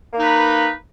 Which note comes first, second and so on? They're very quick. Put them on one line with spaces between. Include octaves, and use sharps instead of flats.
A#3 D#4 B4